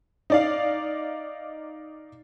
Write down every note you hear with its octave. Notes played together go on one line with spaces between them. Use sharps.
D#4 D5 F5